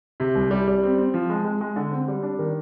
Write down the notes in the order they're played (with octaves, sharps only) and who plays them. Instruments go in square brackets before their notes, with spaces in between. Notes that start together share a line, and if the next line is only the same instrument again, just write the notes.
[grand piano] C3
C2
G3
G3
C4
C4
F3
G#3
G#3
G#3
D3
C4
G3
D4
D#3